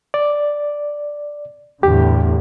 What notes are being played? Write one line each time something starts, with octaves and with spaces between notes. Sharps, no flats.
D5
E2 A2 D3 G4